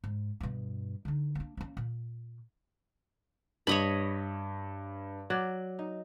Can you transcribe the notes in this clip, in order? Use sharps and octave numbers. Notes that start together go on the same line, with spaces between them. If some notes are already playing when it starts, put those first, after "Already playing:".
G#2
G2 B2
D3 D#4
A#3 D4
A#3 C#4
A#2
G2 C#5 D#5 B5
F#3 D5
D#4